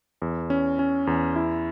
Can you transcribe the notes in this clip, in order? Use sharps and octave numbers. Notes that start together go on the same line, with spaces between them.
E2
C#4
C#4
E2
E4